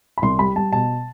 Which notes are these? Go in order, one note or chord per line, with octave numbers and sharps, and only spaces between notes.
B5
C2 C6
G3 B5
G3 A5
B2 A5